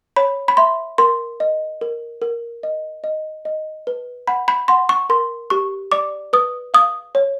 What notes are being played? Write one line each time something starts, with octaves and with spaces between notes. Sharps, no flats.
C#5 B5
B5
E5 C6
A#4 C6
D#5
A#4
A#4
D#5
D#5
D#5
B4
F#5 B5
B5
F#5 C6
C#6
A#4 C6
G4 C#6
D5 D6
B4 D#6
F5 D#6
C#5